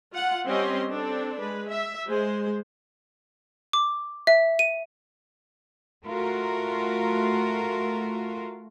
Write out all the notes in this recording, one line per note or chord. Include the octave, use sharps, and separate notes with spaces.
F4 F#5
G3 C4 C#4 G4 D#5 C6
C4 D4 A4
G#3 B4
E5
G#3 C5
D6
E5
D#7
A3 F4 F#4 A#4